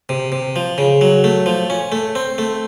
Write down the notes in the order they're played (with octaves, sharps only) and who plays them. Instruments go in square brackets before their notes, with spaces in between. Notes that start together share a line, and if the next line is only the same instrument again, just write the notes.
[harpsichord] C3
C3
F3
C#3
F#3
A3
F3
C#4
A3
C4
A3